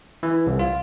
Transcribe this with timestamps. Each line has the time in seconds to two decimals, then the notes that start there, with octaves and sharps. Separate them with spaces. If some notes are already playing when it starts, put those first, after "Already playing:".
0.23 E3
0.47 C2
0.59 F4